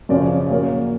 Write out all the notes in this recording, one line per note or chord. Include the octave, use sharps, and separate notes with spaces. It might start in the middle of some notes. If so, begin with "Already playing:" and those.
F#2 C#3 F3 D5
A#2 F#3 A#3 C#4